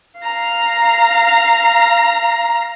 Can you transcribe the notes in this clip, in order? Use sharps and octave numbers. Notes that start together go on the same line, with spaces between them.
F5 A#5